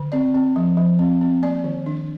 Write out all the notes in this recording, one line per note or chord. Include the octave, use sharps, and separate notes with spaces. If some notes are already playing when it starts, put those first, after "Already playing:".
Already playing: D3
C4 D5
C4
F3
F3
C4
C4
A#3 D5
D#3
D4